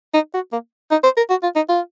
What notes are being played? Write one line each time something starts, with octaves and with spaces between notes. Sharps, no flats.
D#4
F#4
A#3
D#4
C5
A#4
F#4
F4
D#4
F4